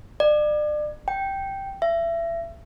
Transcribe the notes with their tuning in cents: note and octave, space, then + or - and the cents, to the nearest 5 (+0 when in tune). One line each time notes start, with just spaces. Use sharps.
D5 +35
G5 -5
E5 +30